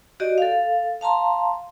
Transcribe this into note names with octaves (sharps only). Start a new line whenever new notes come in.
F#4 G4 D5 D#5
A4 F5
F5 A5 A#5 C6